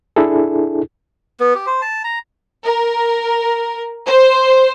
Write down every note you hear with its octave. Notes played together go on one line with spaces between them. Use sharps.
D4 E4 G#4 A4
B3
G4
C5
A5
A#5
A#4
C5